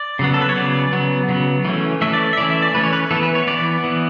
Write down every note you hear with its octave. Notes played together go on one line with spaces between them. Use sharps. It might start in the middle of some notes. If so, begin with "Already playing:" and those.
Already playing: D5
C#3 F#3 B3
A4
B4
C#5
C#3 F#3 B3 D5
C#3 F#3 B3
C#3 F#3 B3
E3 A3 C#4
E3 A3 C#4 E5
D5
E5
E3 A3 C#4 D5
E5
D5
E3 A3 C#4 B4
C#5
B4
E3 B3 A4
B4
C#5
E3 B3 D5
E3 B3